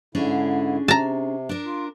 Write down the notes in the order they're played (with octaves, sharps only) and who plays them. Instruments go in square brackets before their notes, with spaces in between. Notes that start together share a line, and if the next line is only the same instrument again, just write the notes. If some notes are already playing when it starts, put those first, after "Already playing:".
[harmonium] G#2 D3 E4 [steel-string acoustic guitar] C#4 D4 G#4
[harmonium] C3 [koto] A5 A#5
[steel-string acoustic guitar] D4 A#4
[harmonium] F4